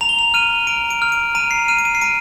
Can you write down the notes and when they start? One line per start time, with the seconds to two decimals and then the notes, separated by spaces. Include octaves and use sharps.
0.01 A#5 F7
0.09 G7
0.19 F7
0.34 F6 D#7
0.67 A#5 D7
0.90 D7
1.02 F6
1.12 D7
1.35 A#5 D#7
1.51 C7
1.68 F6 D#7
1.78 D7
1.85 D#7
1.95 C7
2.01 A#5 D7